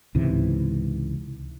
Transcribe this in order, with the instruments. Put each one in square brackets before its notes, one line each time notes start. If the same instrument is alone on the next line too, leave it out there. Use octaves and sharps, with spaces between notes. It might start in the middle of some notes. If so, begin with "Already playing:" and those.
[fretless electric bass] C#2 G#2 C3 E3